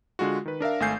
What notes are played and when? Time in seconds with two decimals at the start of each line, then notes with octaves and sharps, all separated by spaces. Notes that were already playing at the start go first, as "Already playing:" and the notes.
0.19 D3 G#3 F4 F#4
0.45 D#3 B4
0.60 D4 A#4 E5 F5
0.80 G#1 A3 F5 G#5 G6 C7